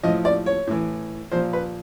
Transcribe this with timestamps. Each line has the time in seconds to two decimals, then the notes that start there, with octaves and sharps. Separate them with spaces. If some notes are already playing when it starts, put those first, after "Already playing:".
0.03 A2 F3 D#5
0.25 D5
0.46 C#5
0.67 A2 E3
1.32 A#2 F3 C5
1.53 B4